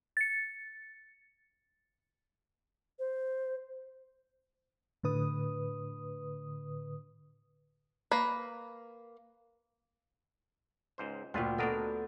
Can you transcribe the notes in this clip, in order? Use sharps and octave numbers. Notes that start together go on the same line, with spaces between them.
A6 C#7
C5
A2 D3 B4 D#6
A#3 B4
C#2 G#2 C5
D2 A#2 F4 B4 C#5 G5
B3 D4 F#4 A4 A#4 D#5